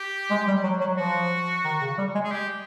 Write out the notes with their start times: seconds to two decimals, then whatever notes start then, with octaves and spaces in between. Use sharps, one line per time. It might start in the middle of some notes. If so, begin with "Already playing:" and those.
Already playing: G4
0.30 G#3
0.47 G3
0.64 F#3
0.81 F#3
0.98 F3 F#4
1.64 D#3
1.81 C#3
1.98 G3
2.15 G#3
2.24 G#4
2.32 G4